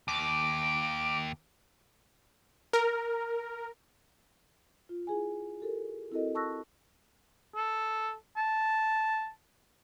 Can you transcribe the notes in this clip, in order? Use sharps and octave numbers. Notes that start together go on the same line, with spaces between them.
D#2 D6
A#4
F4
E4 G#4 G#5
G4 A4 A#4
C4 E4 F#4 A4 A#4 D#5
A5 C#6 E6 F#6 A#6
A4
A5